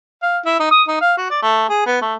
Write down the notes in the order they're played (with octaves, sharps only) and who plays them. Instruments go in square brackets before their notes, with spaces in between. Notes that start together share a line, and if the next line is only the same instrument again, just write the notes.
[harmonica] F5
E4
D#4
D#6
D#4
F5
F#4
D5
A3
G#4
B3
A3